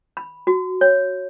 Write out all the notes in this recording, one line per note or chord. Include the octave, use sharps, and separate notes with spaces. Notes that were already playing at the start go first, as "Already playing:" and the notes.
B5
F#4
C#5